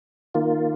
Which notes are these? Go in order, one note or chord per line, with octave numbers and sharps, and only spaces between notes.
D#3 A#3 F4